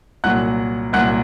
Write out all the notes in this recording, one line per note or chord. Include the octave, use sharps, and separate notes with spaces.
C2 A#2 F#3 F#5 F#6
C2 A#2 F#3 F#5 F#6